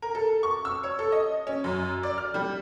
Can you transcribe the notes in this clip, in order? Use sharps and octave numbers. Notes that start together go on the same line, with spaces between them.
A#4
A4
C#6
E6
C#5
A4
D#5
C#4
F#2
D5
F6
G3